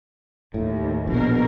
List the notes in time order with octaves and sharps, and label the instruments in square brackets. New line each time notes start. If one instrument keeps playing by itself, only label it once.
[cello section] D#2 [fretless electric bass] A2
[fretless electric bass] A#1 [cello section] B2 A#4